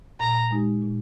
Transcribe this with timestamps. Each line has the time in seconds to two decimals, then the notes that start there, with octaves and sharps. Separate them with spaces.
0.20 A#2 A#5
0.51 G#3 D#4 G4
0.82 A#2